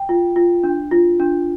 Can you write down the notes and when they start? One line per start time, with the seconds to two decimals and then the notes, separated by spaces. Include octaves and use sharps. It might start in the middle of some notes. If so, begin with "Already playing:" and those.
Already playing: G5
0.09 F4
0.36 F4
0.64 D4
0.91 F4
1.20 D4